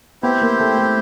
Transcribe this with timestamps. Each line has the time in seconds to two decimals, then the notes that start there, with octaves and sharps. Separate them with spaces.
0.23 B3 C4 E4 G4 C5
0.42 A#3
0.60 A3
0.79 A3